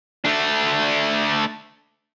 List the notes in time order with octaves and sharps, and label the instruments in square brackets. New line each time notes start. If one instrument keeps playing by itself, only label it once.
[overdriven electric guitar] A3 D4